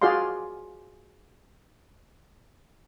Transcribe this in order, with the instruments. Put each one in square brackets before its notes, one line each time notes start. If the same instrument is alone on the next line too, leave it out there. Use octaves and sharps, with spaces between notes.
[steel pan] F4 F#4 G#4 D5 F5 C6